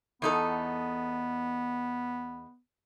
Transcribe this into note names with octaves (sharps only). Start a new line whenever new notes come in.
E2 B3 D#4 A4